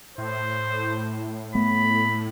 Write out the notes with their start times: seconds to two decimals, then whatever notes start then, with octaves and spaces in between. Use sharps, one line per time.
0.18 A2 C5
1.55 A3 B3 B5